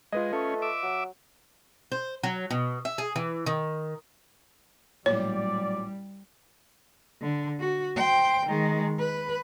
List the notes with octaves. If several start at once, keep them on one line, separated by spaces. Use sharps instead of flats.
G#3 F4 B4 D#5
A3 C#4
E5 D6
F#3
C5
F#3
B2
E5
G#4
E3
D#3
A1 A#2 F#3 G3 C#5 D5
D3
F#4
C5 G5
D#3 G#3
B4